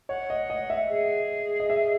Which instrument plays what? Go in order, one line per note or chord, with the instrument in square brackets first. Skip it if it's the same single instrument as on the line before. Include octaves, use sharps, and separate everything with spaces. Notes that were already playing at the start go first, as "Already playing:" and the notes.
[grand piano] C#5 [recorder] F#5
[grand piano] D#5
D#5
E5
[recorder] G#4
[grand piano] D#5
E5